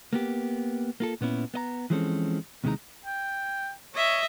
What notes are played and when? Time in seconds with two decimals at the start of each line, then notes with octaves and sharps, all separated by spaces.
0.13 A#3 B3 G4
1.00 A#3 F4 A4
1.21 A#2 B3 C#4 E4
1.54 B3 D#5 A#5
1.90 E3 F3 G#3 C4 C#4 A4
2.64 D#2 C3 E3 G#3 D#4 A#5
3.06 G5
3.94 C#5 D#5 E5